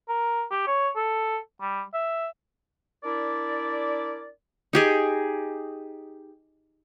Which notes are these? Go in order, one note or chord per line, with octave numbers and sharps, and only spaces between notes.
A#4
G4
C#5
A4
G3
E5
D4 E4 A#4 D5
D#4 G4 G#4